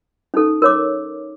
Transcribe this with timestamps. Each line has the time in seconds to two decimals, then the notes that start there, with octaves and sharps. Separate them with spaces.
0.34 C#4 D#4 A4
0.62 A#4 C#5 D6